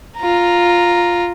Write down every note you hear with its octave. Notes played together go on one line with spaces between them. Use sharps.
F4 A#5